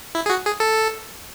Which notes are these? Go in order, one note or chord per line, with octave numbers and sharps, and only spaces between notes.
E4
G#4
F#4
G#4
A4